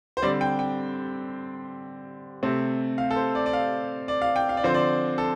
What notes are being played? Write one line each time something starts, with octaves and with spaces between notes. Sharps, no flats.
C5
D3 G3 C4 D5
G5
G5
C3 A3 C4
F5
A4
C5
D5
D5
F5
D5
F5
G5
F5
D5
D3 F3 C4 C5
D5
A4